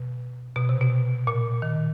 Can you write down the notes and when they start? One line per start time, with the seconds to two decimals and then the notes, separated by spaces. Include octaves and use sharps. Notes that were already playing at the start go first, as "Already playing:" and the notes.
Already playing: B2
0.56 B2
0.69 C3
0.81 B2
1.27 A#2
1.62 D#3